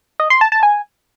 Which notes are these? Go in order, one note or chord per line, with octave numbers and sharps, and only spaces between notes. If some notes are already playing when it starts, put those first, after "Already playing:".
D#5
C6
A5
A5
G#5